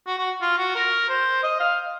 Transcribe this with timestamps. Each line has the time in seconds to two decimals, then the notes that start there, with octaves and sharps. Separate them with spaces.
0.06 F#4
0.18 F#4
0.41 F4
0.58 F#4
0.75 A#4
1.09 C5
1.43 D#5
1.60 F5